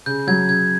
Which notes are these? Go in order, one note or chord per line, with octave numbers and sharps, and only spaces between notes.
C#3 G6
F#3 G#6
C#3 G#6